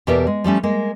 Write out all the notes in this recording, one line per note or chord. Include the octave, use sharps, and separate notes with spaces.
E2 B2 G4 A#4 D5 E5
G#3
F3 G3 A3 C#4
G#3 A#3